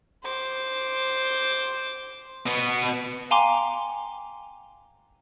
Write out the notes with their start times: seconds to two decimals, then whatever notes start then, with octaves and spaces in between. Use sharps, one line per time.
0.24 C5 D6
2.46 B2 B3
3.31 F5 G5 G#5 A#5 C6 D6